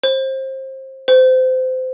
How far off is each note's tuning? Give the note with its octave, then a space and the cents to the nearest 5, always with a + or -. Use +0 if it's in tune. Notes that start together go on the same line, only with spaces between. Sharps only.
C5 +25
C5 -25